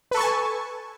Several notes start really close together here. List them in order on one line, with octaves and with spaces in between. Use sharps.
B4 A4 C#6 A5 G#5